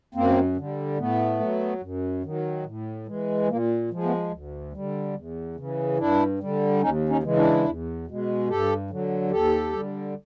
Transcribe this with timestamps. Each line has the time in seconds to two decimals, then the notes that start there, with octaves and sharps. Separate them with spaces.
0.15 F#2 A#3 C4
0.57 D3 G3
0.98 A2 A3 B3
1.40 F#3
1.81 F#2
2.23 D#3 F#3
2.65 A2
3.06 E3 G#3
3.48 A#2 A#3
3.90 F3 G#3
4.03 A3 B3
4.31 D2
4.73 D3 G3
5.14 E2
5.56 C#3 E3
5.98 G2 D4 E4
6.39 D3 G3
6.81 D#2 C#4 D#4
7.09 C#4 D#4
7.23 C#3 E3 G#3
7.36 D4 E4
7.64 E2
8.07 B2 G#3
8.49 G2 G4 A4
8.90 D3 F#3
9.31 D#2 G4 A4
9.73 D3 G3